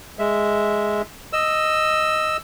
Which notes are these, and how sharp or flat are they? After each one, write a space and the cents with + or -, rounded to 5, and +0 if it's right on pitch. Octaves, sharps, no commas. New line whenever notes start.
G#3 +0 E5 +0
D#5 +0 E6 +0